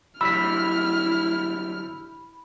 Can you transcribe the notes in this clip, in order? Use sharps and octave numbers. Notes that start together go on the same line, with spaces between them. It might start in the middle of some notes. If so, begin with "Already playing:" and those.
D3 F#3 G3 E4 B5 E6 F6 B6